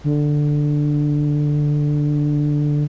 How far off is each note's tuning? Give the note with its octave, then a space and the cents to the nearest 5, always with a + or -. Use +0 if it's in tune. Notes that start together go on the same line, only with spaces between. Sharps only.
D3 +5